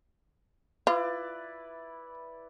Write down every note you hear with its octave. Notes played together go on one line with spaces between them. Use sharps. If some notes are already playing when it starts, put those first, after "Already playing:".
E4 F4 B4 D5